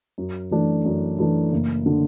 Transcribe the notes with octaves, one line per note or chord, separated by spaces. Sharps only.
F#2
E3 A3 D4
F#2
E3 A3 D4
F#1
D3